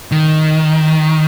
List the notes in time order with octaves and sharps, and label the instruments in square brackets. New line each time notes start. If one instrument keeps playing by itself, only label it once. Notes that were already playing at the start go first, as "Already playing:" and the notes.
[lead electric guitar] D#3